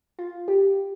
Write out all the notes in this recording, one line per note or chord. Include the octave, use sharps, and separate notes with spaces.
F4
G4